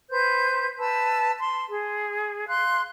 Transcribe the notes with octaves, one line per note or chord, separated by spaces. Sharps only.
B4 C5 G6
B4 A5 E6
C6
G#4
F5 C6 F#6